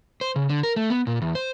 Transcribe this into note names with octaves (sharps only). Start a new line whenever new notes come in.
C5
C#3
D3
A#4
A3
B3
A#2
E2
C5